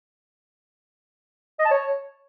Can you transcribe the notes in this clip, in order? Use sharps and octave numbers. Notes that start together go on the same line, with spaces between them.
D#5
A5
C#5